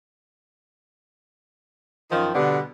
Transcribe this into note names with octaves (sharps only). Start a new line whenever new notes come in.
F#2 D#3 F3 D#4
B2 D3 G3 B3